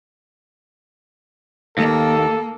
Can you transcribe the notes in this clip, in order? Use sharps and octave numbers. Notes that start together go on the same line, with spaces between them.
D#2 A#3 A4